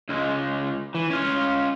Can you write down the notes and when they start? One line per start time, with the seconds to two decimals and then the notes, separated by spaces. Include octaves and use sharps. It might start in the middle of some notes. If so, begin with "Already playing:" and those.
0.09 C#2 G#3
0.95 E3
1.10 C#4 F4